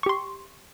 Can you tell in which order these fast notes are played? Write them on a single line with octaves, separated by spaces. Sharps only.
C#6 G4 C6